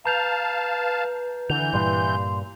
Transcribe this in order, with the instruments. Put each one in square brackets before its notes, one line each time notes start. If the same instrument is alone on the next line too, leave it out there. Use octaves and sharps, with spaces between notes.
[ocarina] B4 [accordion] F5 A5 [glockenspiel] A#5 G6 F7
[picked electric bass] D3 [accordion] E3 G6 [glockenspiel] F7
[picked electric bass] G2 A#2 G3 [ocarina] C6